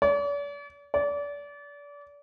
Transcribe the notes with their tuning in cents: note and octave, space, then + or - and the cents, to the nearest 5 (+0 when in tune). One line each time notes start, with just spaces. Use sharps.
D5 -45
D5 -30